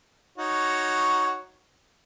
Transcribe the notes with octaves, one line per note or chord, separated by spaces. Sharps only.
D#4 F#4 C#5